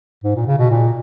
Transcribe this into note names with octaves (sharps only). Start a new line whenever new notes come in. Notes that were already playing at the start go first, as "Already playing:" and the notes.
G#2
A#2
C#3
B2
A#2